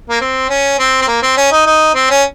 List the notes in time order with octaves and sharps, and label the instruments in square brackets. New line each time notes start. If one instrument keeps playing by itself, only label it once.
[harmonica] A#3
C4
C#4
C4
C4
A#3
C4
C#4
D#4
D#4
C4
C#4